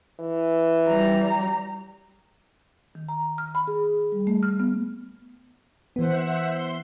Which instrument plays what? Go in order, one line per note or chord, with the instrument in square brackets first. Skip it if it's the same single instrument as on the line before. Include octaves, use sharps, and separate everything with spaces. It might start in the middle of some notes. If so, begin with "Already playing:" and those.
[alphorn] E3
[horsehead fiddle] G3 A#5
[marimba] D#3
A#5
F6
B5
G#4
G3
A3
F6
B3
[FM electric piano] E3 B3 [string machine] C5 E5 F#5
[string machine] C6